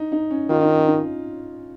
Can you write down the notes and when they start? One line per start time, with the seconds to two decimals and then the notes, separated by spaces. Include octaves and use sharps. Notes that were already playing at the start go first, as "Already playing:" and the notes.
Already playing: D#4
0.12 D#4
0.31 C#4
0.50 D#3 F4
0.62 D#4
0.75 C#4
0.88 D#4